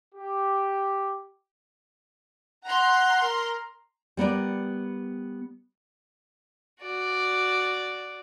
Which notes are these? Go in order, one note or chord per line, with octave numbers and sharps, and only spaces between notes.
G4
F#5 A#5 C6
A#4
G3 B3 A#4 D5
F#4 D5